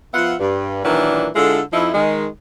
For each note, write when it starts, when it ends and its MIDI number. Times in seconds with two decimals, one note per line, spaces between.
0.14 0.35 53
0.14 0.35 59
0.14 0.35 65
0.14 0.35 76
0.14 0.35 78
0.40 0.81 43
0.85 1.28 46
0.85 1.28 51
0.85 1.28 52
0.85 1.28 54
0.85 1.28 62
1.35 1.60 50
1.35 1.60 56
1.35 1.60 62
1.35 1.60 64
1.35 1.60 65
1.35 1.60 69
1.73 1.90 41
1.73 1.90 53
1.73 1.90 63
1.73 1.90 64
1.94 2.26 51
1.94 2.26 56